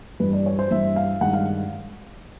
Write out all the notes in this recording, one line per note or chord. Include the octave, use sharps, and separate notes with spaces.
G2 E3 G3 B4
D5
C#5
C5
G2 E3 G3 E5
F5
G2 D#3 G#3 F#5
F5